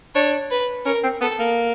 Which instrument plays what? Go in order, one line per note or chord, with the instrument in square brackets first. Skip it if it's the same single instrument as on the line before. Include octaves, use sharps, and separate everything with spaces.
[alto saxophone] D4 [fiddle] C#5
[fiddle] B4
[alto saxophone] C#4 [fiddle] A#4
[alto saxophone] C4
[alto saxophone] B3 [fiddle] A4
[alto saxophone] A#3